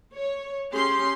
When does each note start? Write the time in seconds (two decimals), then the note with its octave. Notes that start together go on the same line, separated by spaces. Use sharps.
0.15 C#5
0.73 C#4 G4 G#4 C6